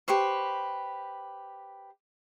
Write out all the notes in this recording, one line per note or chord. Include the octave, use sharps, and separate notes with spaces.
G4 B4 C5 C#6